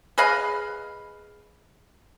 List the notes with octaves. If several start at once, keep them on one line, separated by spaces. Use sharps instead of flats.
G#4 B4 D#5 F5